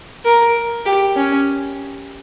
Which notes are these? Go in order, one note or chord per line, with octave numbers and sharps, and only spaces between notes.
A#4
G4
C#4